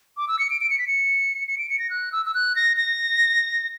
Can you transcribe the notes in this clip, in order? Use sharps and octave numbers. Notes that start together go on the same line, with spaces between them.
D6
E6
C#7
D7
D7
C#7
B6
C#7
C#7
D7
C#7
A#6
F#6
E6
E6
F#6
A#6
A#6